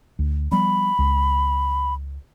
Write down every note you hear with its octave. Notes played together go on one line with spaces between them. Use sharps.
D2
F3 G3 B3 B5
C#2